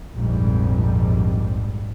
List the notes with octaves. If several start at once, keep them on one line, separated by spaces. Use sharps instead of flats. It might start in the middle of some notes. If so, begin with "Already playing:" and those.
A#1 F2 G#2 G3